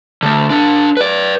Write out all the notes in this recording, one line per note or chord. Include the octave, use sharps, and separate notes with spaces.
D3 A3
D4 A#4
B4 D5